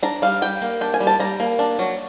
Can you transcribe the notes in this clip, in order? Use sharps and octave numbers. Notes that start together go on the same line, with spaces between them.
D4 A#5
G3 F5
G3 G5
A#3
D4 G5
G#5
G3
A5
G3 A#5
A#3
D4
F#3